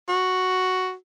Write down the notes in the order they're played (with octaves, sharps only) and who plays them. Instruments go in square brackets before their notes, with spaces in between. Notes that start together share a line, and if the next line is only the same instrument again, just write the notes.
[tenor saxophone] F#4